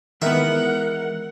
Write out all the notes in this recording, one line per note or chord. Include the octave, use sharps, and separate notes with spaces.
D#3 E3 G#3 B3 A#4 E5 F#5